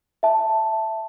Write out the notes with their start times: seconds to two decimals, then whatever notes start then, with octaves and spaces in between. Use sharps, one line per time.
0.23 E5 A5